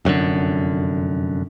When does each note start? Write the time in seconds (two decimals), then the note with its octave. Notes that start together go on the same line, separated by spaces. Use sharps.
0.05 F1 F#2 B2 D3